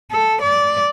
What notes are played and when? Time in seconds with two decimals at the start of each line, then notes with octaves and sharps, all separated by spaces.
0.11 A4
0.41 D5